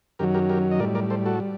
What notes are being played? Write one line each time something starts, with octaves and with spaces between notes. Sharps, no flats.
F#2 D#3 F#3 G4 A#4
G4 A#4
G4 A#4
D#5
A2 G3 A#4 D5
A#4 D5
A4 C5
F#4 A4
G3